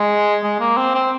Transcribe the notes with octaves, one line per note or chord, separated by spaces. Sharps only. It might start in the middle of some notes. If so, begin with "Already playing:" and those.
Already playing: G#3
G#3
A#3
C4
C4